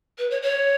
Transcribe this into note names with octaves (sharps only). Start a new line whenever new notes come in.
B4
C#5
C#5